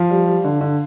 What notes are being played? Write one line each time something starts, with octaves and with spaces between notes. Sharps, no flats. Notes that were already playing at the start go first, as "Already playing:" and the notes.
Already playing: F3 F5
G3
G3
D3
D3